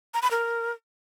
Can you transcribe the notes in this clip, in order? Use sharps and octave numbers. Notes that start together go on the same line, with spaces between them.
A#5
B5
A#4